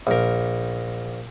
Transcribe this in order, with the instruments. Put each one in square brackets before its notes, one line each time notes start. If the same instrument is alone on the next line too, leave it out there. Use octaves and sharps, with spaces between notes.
[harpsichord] A#1 A#4